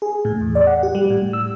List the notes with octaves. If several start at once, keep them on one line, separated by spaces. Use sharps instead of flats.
G#4
A2
E2
D5
F#5
G4
G3
A2
E6